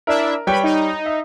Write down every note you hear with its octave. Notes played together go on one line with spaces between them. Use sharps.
D4 E4 A#4 E5
G3 B4 C#5 G5 B5
D#4
E5